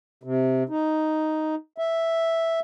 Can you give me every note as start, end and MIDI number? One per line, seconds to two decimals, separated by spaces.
0.23 0.63 48
0.69 1.55 63
1.78 2.60 76